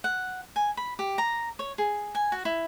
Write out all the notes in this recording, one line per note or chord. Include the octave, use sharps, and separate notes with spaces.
F#5
G#5
B5
G4
A#5
C#5
G#4
G#5
F#4
E4